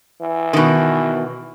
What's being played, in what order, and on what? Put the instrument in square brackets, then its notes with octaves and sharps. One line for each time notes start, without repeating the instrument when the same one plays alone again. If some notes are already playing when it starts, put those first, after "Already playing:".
[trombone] E3
[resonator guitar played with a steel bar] B2 D#3